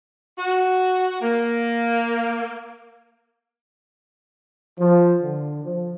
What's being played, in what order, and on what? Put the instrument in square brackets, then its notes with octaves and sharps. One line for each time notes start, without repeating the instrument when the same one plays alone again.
[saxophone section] F#4
A#3
[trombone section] F3
D3
F3